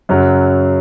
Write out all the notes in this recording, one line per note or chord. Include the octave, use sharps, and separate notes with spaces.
F#2 C#3 F#3